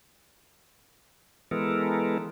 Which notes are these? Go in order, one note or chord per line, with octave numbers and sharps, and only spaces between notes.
E3 G#3 B3 A4 A#4